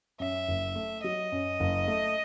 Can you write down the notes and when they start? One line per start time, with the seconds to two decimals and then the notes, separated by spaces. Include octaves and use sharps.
0.20 F#2 E5
0.48 F#1
0.76 A3
1.04 F#3 D#5
1.32 F#2
1.60 F#1
1.88 A3